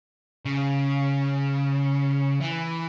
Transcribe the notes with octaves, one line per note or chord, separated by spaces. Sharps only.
C#3
E3